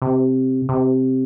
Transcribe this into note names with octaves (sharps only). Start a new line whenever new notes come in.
C3
C3